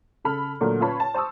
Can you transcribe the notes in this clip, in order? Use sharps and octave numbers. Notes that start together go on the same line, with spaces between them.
C#3 A4 B5 F6
A#2 D3 F#3 A3 A#3
C#4 F4 B4 C#5 A5 B5
A5
C5 A5 C#6 D#6 E6